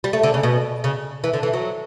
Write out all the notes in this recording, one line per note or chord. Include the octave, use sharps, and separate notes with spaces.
G3
A3
D3
C#3
B2
C#3
E3
D3
E3
F#3